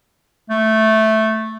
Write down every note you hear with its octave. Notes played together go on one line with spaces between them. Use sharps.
A3